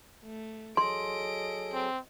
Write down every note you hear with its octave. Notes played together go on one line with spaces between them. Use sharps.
A3
F#3 G#4 A4 D#5 C6 D7
C4